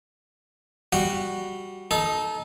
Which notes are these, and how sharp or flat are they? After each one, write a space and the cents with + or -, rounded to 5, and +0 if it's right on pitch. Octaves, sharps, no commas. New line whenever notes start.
G3 +0 F#4 +0 F#5 +0
D#4 +0 A4 -25